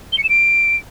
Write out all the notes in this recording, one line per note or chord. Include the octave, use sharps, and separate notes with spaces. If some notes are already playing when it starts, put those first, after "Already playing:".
G7
C#7
E7
D7